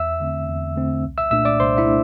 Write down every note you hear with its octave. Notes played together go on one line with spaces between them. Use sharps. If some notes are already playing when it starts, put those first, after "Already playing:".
Already playing: E2 E5 E6
D3 A3 C4
E2
D3 A3 C4
C2
E5 E6
A#2 A3 D4 E5 E6
D5 D6
C2 C5 C6
E4 E5
A3 D4